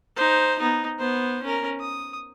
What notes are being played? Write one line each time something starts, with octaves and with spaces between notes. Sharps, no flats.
D#4 C5
B3 D#4
B3 C5
C#4 A#4
D#6